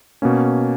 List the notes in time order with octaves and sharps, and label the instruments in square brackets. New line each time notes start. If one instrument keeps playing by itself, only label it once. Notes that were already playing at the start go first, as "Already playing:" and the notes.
[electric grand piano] B2 A#3 C#4